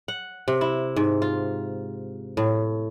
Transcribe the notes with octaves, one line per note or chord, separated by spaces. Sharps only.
F#5
C3
E4
G#2
F4
A2